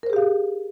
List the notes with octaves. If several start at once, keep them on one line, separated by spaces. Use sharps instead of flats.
G4 G#4 A#4 C5 F5